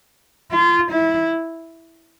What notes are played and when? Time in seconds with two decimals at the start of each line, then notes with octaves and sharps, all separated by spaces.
0.52 F4
0.92 E4